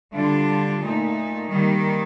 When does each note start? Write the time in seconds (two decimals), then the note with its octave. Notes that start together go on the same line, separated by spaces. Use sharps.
0.13 D3 G3 D4 F4
0.81 A#2 A3 D#4
1.48 D#3 G3 A#3